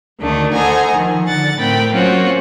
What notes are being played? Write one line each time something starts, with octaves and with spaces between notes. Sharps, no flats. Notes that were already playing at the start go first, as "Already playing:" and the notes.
D2 D#3 A3 D4
A4 C5 D#5 F#5 G#5 A#5
D#3 F3
D3 F#5 A6
A2 C4 A#4 G5 B5
F#3 A#3 C4 C#4 F4 F#4